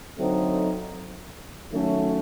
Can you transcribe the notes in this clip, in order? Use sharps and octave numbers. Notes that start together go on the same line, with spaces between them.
D3 F#3 A3 C4 D#4
D#3 F#3 A3 C#4